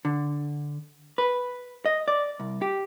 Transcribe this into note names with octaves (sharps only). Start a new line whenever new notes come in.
D3
B4
D#5
D5
C2
G4